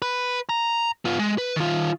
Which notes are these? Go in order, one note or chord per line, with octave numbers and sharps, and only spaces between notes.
B4
A#5
B3 F4
G#3
B4
D#3 F4